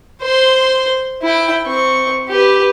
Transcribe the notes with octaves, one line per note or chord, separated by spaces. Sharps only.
C5 C6
E4 G5
C4 C#6
G4 B4